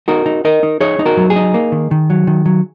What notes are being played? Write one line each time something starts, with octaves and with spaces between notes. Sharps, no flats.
D#4 F#4 A#4
D#4
D#4 A#4 D#5
D#4
D#4 G#4 C#5
D#4
F#4 A#4
F#3
G#4
D#4
A#3
D#3
D#3
F#3
D#3
F#3